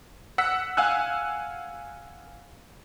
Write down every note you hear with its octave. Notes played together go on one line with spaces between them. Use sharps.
F#5 E6 B6
F5 F#5 G#5 E6 F#6